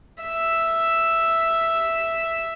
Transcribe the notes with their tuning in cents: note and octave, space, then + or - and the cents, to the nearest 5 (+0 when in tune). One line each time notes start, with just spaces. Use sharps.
E5 +0